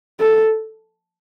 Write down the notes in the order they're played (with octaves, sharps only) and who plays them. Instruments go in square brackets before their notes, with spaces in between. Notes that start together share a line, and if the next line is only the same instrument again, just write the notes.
[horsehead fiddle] A4